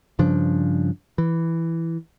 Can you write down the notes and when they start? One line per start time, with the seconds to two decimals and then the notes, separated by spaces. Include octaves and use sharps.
0.19 G2 C#3 F3 D4
1.18 E3